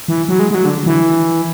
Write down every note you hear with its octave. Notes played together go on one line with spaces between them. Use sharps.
E3
F#3
G#3
G#3
F#3
D3
E3